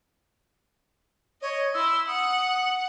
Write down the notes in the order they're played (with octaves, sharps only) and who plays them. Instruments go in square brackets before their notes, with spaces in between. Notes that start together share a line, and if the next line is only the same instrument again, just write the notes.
[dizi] C#5 [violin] D#5
[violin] E4 C6 [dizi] E6
[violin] F#5 [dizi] D#6